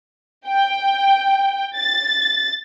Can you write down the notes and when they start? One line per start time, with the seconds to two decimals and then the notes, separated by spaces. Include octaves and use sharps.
0.47 G5
1.77 A6